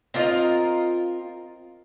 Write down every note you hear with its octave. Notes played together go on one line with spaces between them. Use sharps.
C4 F4 A#4 D#5